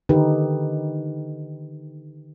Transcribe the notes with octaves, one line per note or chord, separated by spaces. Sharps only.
D3 D#3 D#4 G4 A4 B4